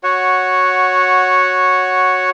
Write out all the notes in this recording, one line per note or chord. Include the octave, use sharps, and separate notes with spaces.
F#4 C#5 F#5